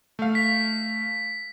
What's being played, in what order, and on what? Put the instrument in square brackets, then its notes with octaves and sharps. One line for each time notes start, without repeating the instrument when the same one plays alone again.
[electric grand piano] A3 F5
[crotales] B6